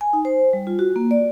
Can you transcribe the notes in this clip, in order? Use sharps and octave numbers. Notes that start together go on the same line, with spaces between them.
G#5
D#4
C5
G3
F4
F#4
A#3
D5